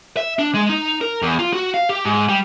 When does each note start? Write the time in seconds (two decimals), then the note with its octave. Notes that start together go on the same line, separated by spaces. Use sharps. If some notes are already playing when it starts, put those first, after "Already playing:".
0.17 E5
0.39 D4
0.54 G#3
0.69 D#4
1.01 A#4
1.22 E2
1.39 F4
1.53 F#4
1.74 F5
1.89 G4
2.05 G#2
2.29 G3